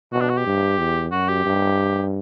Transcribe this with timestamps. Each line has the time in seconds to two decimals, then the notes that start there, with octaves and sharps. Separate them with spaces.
0.12 B2 F#4
0.21 D4
0.30 F#4
0.37 G4
0.46 G2
0.78 E2
1.11 F#2 F#4
1.28 G4
1.46 G2